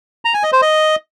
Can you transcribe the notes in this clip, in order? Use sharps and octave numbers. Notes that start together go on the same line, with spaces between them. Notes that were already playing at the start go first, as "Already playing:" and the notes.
A#5
G#5
D#5
C5
D#5